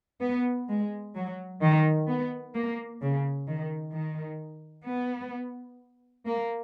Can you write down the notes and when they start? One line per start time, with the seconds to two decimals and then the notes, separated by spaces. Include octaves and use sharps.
0.21 B3
0.69 G#3
1.15 F#3
1.61 D#3
2.08 B3
2.54 A#3
3.01 C#3
3.47 D#3
3.94 D#3
4.86 B3
6.26 A#3